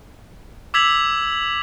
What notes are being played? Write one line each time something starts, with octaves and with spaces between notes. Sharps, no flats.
D6 E6 G#6 B6 F7 F#7